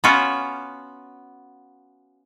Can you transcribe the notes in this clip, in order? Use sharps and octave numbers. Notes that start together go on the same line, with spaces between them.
B3 C#4 F4 F#4